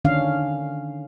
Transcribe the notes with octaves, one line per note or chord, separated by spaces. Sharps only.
D3 D#3 C#4 D4 F5